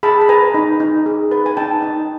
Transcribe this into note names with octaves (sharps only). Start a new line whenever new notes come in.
G#4 A5 B5
B5
B4 G#5 A#5
D#4
D#4
G#4
B4
G#5
D#4 G5 A5
D#4